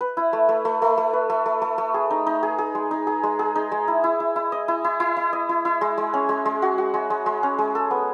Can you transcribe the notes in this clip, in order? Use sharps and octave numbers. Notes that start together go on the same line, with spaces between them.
B4
E4
A3
A3
A3
A3
A3
B4
A3
A3
A3
A3
G#4
D#4
D#4
G#4
G#4
G#3
D#4
G#4
G#3
G#4
D#4
G#3
E4
E4
E4
E4
D#5
E4
E4
E4
E4
D#5
E4
E4
G#3
G#3
C#4
G#3
G#3
F#4
F#4
G#3
G#3
G#3
C#4
G#3
A4
B3